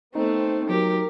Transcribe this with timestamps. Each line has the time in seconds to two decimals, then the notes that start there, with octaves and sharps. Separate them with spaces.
0.15 A3 B3 C4 D#4
0.69 F#3 G4 A#4